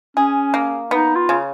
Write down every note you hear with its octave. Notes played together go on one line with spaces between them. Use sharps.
C#4 G#4
A#3
B3 D#4
F4
C#3